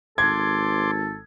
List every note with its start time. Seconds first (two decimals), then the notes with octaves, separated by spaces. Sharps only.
0.18 G#1 A4 C6 D6 G#6